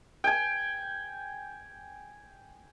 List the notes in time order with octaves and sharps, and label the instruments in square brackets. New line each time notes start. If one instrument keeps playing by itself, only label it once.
[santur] G5 G#5